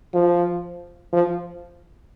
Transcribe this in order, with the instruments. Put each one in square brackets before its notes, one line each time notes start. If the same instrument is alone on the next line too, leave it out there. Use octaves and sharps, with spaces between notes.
[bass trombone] F3
F3